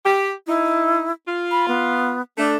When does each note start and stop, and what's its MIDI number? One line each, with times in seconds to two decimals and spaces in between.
0.04 0.31 67
0.47 1.04 63
0.47 1.12 64
1.27 2.12 65
1.51 1.66 83
1.68 2.22 59
2.38 2.56 57
2.38 2.56 62